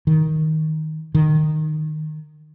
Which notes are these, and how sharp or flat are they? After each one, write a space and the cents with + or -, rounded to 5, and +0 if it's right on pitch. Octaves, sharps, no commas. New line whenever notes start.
D#3 +10
D#3 -15